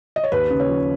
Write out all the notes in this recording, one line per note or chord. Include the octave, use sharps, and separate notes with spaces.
D#5
C#5
D#2 B4
C#3
C#5
F3